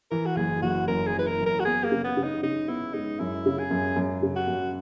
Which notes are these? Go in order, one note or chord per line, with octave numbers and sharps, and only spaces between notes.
E3 A#4
F#4
F#1 G#4
F#1 F#4
F#2 A#4
G#4
E3
B4
A#4
F#2
A#4
F#4
B3 G#4
A#3
C#3
B3
C#3
D#4
C#3 D#4
B3 E4
G#3 D#4
F#2 E4
C#3
G#4
F#2
F#2
C#3
F#4
F#2